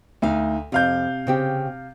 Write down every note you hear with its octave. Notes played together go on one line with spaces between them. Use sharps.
D2 D#4 F5
F2 C3 F5 G6
C#3 C4 G4